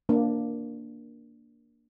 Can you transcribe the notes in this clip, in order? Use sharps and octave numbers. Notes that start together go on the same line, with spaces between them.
A#3 D4